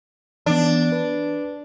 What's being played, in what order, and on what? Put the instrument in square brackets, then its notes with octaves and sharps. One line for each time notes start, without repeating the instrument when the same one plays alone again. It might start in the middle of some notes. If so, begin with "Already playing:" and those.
[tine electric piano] E3 B3 [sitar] D4
[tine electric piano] B4